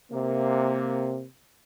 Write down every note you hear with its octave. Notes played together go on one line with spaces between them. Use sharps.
C3 A#3